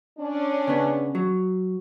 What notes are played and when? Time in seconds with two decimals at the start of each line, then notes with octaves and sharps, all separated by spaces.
0.19 C#4 D4
0.67 C#3 B3
1.15 F#3